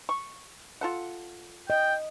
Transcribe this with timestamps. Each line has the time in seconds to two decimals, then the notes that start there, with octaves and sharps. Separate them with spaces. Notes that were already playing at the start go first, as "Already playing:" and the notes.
0.09 C#6
0.81 F4 A4 F#5
1.70 D#5 G5